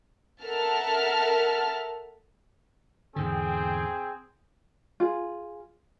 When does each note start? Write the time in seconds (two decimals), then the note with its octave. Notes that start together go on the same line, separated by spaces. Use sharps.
0.44 A4 A#4 E5 F#5 A5 F6
3.16 E2 G#2 D3 C4 G#4 G5
5.00 F4 G#4